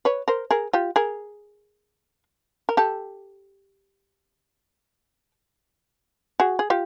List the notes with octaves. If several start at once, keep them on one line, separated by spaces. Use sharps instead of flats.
B4 C#5
A#4 C5
G#4 A#4
F4 G4
G#4 A#4
A#4
G4 A4
F#4 G#4
G#4
F4 G4